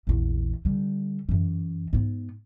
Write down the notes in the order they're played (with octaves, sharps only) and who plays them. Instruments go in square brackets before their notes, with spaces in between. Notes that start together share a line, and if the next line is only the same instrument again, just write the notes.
[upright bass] A#1 E2
D3 G3
F#2 E3
G#2 B3